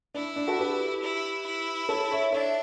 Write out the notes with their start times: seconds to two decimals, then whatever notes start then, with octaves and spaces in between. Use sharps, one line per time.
0.14 D4 E4
0.36 D4
0.48 F#4 A4
0.59 G4 B4
1.02 E4
1.46 E4
1.89 A4 C#5
2.11 C#5 E5
2.32 D4 C#5 E5